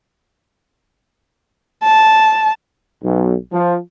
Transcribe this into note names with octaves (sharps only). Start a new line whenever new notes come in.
A5
B1
F3